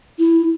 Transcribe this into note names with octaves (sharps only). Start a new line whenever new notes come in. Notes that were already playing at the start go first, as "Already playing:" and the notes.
E4